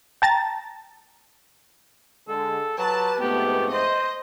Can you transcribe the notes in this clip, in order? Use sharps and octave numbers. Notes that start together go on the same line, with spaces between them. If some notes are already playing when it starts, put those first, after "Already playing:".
G5 A5 A#5 A6
D3 G#3 A4
F#3 G4 B4 A5
F2 G#2 A3 B3 G4
C5 D#5